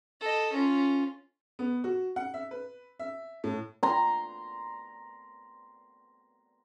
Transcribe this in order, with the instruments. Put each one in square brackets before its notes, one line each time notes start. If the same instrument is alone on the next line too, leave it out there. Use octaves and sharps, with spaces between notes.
[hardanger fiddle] A4 D#5
C#4 F4
[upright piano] B3
F#4
F#5
E5
B4
E5
A2
[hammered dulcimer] A#5 C6